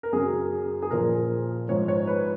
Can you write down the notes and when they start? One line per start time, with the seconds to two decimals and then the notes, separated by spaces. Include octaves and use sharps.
0.03 A#4
0.13 F#2 C#3 F#3 G#4
0.82 G#4
0.91 A#2 F3 A#4
1.69 G#2 F3 C#5
1.88 C#5
2.07 B4